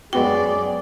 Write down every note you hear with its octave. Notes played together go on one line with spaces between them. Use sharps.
F#2 G#3 B3 F#4 G#4 D5 G5